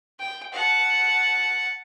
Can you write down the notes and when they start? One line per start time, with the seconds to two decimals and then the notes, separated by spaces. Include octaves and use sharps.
0.20 G5
0.53 F#5 A5